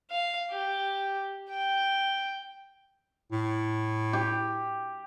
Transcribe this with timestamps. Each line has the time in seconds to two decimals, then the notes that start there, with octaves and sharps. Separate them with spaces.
0.11 F5
0.51 G4
1.51 G5
3.32 A2
4.13 G4